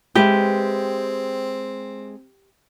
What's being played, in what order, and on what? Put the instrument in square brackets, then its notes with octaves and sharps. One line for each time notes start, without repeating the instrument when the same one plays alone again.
[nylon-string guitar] G#3 B4 E5 [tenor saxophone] C4 [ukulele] G4